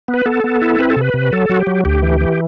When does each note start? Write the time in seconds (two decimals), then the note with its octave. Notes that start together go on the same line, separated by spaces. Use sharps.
0.08 B3
0.14 B4
0.26 B3 A4
0.44 B3
0.62 E4
0.79 C4 B4
0.90 A4
0.97 C3 B4
1.14 C3
1.32 F#3 A4
1.50 F#3 F#4
1.59 G4
1.67 F#3
1.85 D2 G4
2.02 E3
2.21 E3